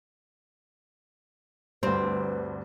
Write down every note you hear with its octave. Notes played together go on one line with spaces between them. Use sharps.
D2 G2 C4 B4